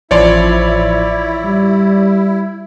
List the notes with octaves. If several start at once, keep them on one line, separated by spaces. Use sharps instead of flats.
A1 F3 E4 C#5 D5 C6
G3